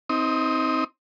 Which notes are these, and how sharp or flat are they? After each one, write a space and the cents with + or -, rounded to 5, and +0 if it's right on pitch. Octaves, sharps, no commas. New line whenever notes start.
C4 +0 D#4 +30 D#6 +0